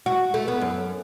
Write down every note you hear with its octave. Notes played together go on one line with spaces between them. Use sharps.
F#4
A3
B3
F#2